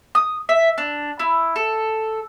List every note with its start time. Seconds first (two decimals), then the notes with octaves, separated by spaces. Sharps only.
0.15 D#6
0.49 E5
0.78 D4
1.19 E4
1.56 A4